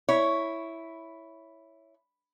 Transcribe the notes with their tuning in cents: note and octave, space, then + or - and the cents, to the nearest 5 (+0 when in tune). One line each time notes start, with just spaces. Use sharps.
E4 +0 C#5 +0